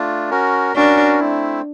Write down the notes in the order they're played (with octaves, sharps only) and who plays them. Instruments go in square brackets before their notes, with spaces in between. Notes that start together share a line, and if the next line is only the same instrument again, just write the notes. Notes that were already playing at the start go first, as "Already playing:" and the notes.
Already playing: [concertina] A3 D4 F4
C#4 F#4 A#4
[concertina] C#4 F#4 A#4 [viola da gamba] D4
[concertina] A3 C4 E4